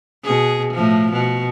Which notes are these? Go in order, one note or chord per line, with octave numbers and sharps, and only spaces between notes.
B2 G#4
A2 F3
B2